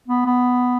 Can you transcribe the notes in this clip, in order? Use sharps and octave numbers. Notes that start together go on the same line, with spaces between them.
B3
B3